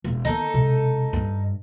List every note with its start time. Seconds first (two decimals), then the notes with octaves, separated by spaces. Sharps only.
0.04 E1
0.25 D#3 B3 D#4 A4
0.54 E1 C3
1.13 G2